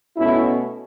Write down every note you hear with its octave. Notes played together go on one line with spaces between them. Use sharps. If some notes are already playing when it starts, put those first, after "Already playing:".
B2 A3 C#4 E4